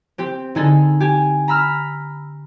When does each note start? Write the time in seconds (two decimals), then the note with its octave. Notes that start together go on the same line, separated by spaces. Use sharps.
0.18 C4 G4
0.55 D3 D#4 G#4 A4
1.00 G4 G#5
1.48 A#5 B5 E6 F6